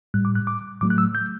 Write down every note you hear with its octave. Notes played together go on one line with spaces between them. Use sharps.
A2 G3 F#6
D6
F#6
D6
A2 F#3 A3 D6
F#6
E6
G6